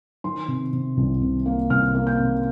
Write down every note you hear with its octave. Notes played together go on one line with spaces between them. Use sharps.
D#3 C6
C3
C3
C2
C3
A#3
C2 F6
A#3
G6
C3